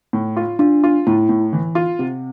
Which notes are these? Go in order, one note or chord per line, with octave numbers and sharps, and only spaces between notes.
A2
F4
D4 F4
F4
A2 E4
A2
E3
F4
C3 C4